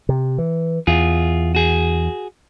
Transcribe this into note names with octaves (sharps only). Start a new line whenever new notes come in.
C3
E3
E2 F4 G#4
F#4 G#4